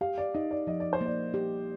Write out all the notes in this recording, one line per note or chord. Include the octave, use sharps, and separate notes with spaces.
G4 F5
D5
D#4 D#5
D5
F3 D#5
D5
C5
A#3 D5
G4